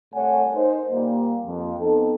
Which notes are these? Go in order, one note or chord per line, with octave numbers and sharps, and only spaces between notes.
C2 A3 C#5 F#5 G#5
D#4 A#4 C5
A#2 G3 A#3
F2
B3 C4 D#4 A4